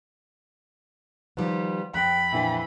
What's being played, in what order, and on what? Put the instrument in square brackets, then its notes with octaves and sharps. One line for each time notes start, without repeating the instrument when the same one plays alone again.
[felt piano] D#3 F3 C5 [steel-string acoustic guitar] G3 B3
[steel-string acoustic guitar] F2 C4 G5 [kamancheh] B5 [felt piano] F#6 A#6
[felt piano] A#2 D3 G#5 [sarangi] E3